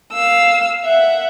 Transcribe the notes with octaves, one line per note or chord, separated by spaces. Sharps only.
F5 E6
E5 F#5